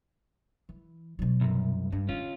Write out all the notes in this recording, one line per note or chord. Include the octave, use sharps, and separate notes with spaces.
E3
B2 F#3
C2 F#2
G2 D4
D3 C#4 D4 F4